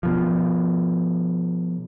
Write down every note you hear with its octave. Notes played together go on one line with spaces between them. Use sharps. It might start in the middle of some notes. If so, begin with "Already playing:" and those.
B2 F3